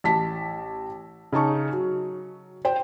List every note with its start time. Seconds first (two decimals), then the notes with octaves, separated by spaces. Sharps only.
0.04 A1 A5 B6
1.32 C#3 D#4 A5 C#6
1.72 F#3
2.65 C5 G5